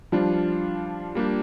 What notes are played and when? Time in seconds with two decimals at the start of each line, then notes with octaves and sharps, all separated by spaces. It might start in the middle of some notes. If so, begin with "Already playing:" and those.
0.12 F3 G3 D4 F4
1.15 G3 A#3 D4 G4